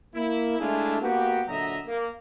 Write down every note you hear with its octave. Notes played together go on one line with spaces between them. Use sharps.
A#3 E4
G#3 A3 D4 E4 F4 G#4
A#3 B3 F#4 G4
A#2 D3 F#3 D#5 E5 A#5
A#3